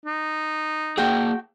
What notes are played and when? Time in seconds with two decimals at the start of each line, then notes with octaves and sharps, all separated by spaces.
0.06 D#4
0.98 A#3 F#4 G#4 G5